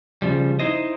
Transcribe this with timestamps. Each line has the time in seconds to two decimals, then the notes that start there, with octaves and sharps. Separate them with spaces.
0.22 C#3 F3 G3
0.59 D#4 E4 C5 D#5